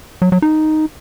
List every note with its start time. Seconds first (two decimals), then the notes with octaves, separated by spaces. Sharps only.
0.22 F#3
0.32 F#3
0.42 D#4